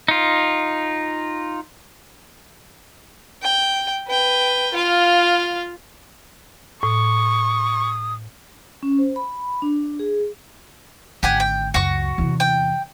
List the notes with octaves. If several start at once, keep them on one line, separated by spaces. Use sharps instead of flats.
D#4 F4
G5
B4 G5
F4 F5
A2 C#6 D#6
C#4
C5
B5
D4
G#4
G#1 D3 G4 F#5 G#5
G5
C#2 F#2 F#4 C#6
E2 C3
G5